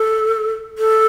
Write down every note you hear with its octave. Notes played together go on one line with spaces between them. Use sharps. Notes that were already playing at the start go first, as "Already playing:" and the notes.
Already playing: A4
A4